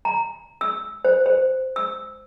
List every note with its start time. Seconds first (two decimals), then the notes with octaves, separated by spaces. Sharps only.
0.05 A#5
0.61 E6
1.05 C5
1.26 C5
1.76 E6